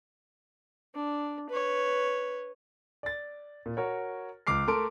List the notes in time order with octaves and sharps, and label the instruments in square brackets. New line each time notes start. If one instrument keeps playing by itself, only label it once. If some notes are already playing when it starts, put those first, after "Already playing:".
[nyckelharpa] D4
B4 C#5
[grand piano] D5 A6
A#2
F#4 A#4 C#5
C#2 D6 F6 C7
A3 A#4 A5 C6 D7